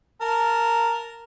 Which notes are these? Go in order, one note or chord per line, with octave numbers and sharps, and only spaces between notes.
A#4 A5